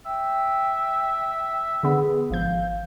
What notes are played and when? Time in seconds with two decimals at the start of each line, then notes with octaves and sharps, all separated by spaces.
0.06 E5 G5
1.83 D3 B3 G#4
2.30 G#1 F3 F5 G6